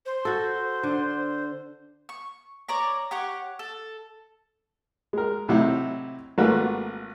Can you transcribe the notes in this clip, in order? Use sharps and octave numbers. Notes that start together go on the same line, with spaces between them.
C5
F#4 A4
D3
C#6
A#4 C#5 D5 A#5
G4 C#5 F#5
A4
G#3 A#4
A2 C3 F#3 D#4 E4
G#1 A3 A#3 F4 F#4 B4